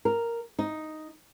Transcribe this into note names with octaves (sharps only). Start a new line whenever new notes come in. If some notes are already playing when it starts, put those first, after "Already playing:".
A#4
D#4